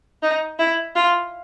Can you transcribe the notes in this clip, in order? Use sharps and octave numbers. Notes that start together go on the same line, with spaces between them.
D#4
E4
F4